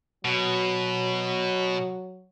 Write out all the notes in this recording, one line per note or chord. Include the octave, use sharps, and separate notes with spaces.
B2 F#3